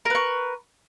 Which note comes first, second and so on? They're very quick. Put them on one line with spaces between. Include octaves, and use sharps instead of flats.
A#4 B4 C#6